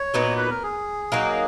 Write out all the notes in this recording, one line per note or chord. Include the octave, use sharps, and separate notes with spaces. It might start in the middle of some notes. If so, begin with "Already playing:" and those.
Already playing: C#5
A#2 F#3 B3 D#4
B4
A#4
G#4
F#3 A#3 D#4